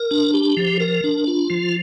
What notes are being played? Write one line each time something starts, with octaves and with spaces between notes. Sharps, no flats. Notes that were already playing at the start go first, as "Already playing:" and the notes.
Already playing: A#4
D4
G4
F3
A#4
D4
F4
F3